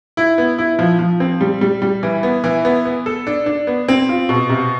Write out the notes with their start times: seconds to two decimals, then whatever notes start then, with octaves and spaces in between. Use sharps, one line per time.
0.17 E4
0.38 B3
0.58 E4
0.79 F3
0.99 F3
1.20 C4
1.41 G3
1.61 G3
1.82 G3
2.03 E3
2.23 B3
2.44 E3
2.65 B3
2.85 B3
3.06 A4
3.27 D4
3.46 D4
3.67 B3
3.88 C4
4.09 F4
4.29 B2
4.49 C3